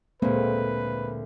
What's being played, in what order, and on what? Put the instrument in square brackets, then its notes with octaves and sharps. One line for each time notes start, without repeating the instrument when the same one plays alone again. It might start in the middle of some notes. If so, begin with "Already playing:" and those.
[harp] D2 A#2 [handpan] G#3 A#3 C4 [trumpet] B4